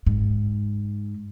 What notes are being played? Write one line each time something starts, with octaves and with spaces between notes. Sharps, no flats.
G#2